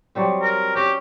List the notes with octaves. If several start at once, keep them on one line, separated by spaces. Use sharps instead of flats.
F#3 G3 C4
A#4
C#4 G4